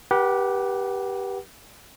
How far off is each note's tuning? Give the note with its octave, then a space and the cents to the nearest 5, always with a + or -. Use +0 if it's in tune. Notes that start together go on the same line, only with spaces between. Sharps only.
G4 +0 B4 -35 F#5 +25